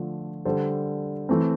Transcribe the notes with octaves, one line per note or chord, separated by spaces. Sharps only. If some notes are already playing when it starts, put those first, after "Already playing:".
Already playing: D3 F3 A3
D3 G3 D4 A4 C5
E3 A3 C4